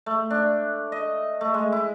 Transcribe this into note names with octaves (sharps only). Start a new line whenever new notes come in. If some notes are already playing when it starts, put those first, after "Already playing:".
A3
D4
D#5
A3
G#3
E4